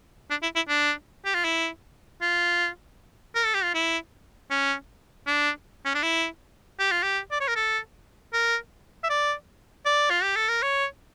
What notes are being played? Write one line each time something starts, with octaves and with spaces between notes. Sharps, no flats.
D4
E4
E4
D4
G4
F4
E4
F4
A#4
A4
G4
F4
E4
C#4
D4
C#4
D4
E4
G4
F4
G4
D5
C#5
A#4
A4
A#4
E5
D5
D5
F4
G4
A4
A#4
C#5